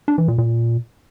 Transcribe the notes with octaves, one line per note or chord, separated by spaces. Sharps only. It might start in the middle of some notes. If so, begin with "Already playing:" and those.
D4
E3
A#2
A#2